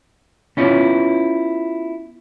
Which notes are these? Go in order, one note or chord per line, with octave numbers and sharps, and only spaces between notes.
B3 C#4 E4 F4